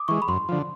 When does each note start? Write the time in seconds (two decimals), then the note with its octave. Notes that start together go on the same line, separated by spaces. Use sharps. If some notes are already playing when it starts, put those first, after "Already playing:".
Already playing: D6 D#6
0.08 E3 G#3 C#6
0.22 B5
0.28 F#2 C6
0.49 D3 F3